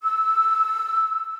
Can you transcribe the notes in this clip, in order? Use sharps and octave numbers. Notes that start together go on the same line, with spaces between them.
E6